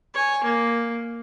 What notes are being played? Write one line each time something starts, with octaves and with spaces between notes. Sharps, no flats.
C#5 G#5
A#3